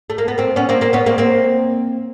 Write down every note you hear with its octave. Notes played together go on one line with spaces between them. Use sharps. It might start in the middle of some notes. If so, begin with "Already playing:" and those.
A3
A#3
B3
A#3 C4
B3 C#4
A#3 C4
A#3 C4
B3 C#4
A#3 C4
A#3 C4